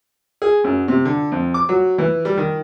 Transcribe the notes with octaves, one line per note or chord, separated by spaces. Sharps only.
G#4
F#2
C3
D3
F2
D6
F#3
E3
G3
D#3